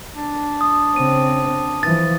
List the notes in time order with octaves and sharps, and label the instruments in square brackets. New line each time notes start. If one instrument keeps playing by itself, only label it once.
[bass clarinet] D4
[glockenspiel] D#6
[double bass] C#3 C4 [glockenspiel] D#7
[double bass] E3 F3 [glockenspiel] A6